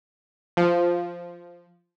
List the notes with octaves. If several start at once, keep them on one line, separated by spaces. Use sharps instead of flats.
F3